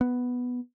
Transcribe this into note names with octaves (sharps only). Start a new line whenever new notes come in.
B3